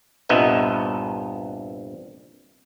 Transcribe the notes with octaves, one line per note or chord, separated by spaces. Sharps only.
C2 G2 A#2 B3 D#5 E5